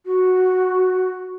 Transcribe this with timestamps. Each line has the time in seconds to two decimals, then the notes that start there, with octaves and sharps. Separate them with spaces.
0.06 F#4